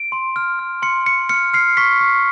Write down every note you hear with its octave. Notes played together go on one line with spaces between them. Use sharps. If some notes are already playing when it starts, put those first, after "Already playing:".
Already playing: D7
C6
F6
F6
C6 C#7
C6 C#7
F6 C#7
F6 C7
C#6 B6
C#6